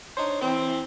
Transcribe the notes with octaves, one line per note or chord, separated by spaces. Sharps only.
D4 D#4 C5 C#5
E3 C4